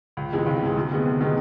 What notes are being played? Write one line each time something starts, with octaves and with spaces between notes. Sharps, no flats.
C#2
C3 E3 G#3
C#2
C3 E3 G#3
D2
C3 D#3 G#3 B3
D2
C3 D#3 G#3 B3